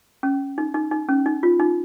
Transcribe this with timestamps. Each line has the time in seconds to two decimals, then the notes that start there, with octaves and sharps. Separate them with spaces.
0.23 C#4
0.58 D#4
0.74 D#4
0.91 D#4
1.09 C#4
1.26 D#4
1.43 F4
1.60 D#4